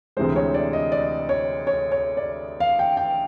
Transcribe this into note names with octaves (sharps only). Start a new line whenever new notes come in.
D2 C3 E3 G#3 C5
C#5
D5
D#5
D5
C#5
C#5
C#5
D5
F5
G5
G5